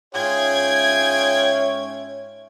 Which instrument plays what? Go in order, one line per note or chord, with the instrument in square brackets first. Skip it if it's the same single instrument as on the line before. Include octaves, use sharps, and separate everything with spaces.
[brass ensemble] G#2 C#4 E5 [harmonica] F4 G#4 G5 [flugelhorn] C#5 [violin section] G#6